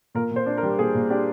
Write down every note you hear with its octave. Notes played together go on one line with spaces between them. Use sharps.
A#2 A#4
A#2
C5
D4
A#4
G3
A#2 G#4
A#2
D4 G4